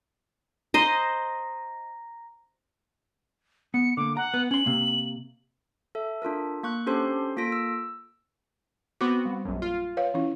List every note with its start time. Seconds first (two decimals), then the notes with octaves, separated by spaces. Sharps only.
0.74 C5 D#5 A#5 A#6
3.74 B3 C#7
3.97 D3 A#3 D6
4.17 F#5 A#5
4.34 B3
4.51 C#4 C6 F#7
4.66 C3 A#3
5.95 A4 E5
6.22 D4 F4 A4 A#4
6.63 A#3 C#6 F#6
6.86 C#4 D4 G4 A4 C5 C6
7.37 A#3 F4 A4 A#6 B6 D7
7.52 E6
9.01 B3 C4 F#4 D6
9.25 G3
9.45 A#1 F#2
9.62 F4
9.97 B4 C#5 F5
10.14 E3 C#4 E4